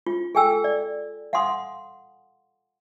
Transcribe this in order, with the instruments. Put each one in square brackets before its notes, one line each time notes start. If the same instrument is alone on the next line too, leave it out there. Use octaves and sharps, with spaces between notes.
[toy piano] F4
G#4 A4 G5 G#5 E6
D5
F5 F#5 G#5 C6 D#6